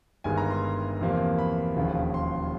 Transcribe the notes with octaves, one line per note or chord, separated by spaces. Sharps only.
G1 G2 D#3 G#3 B3 G#5
A#5
C6
E2 C3 F3 A#3
B5
E1 D#2 C#3 F3
C6